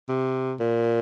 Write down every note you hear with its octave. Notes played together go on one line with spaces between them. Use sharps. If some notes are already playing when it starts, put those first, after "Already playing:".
C3
A#2